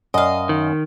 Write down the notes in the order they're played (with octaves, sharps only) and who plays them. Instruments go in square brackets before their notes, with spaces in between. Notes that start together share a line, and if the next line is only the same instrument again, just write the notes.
[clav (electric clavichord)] F#2 [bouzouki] D#5 F5
[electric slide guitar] D#3